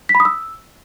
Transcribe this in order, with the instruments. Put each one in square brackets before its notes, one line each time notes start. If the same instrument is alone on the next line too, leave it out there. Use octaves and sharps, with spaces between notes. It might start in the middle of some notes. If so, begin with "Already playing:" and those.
[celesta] B6
B5
D#6
E6